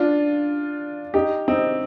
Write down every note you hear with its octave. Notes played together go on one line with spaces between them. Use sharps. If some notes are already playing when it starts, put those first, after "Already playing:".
Already playing: D4 F4
D#4 G4
C4 D#4